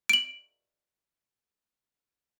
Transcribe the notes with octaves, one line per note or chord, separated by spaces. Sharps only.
D7 F#7